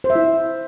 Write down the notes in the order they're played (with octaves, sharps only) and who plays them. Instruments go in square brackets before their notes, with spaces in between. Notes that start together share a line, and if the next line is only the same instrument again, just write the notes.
[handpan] C5
E5
E4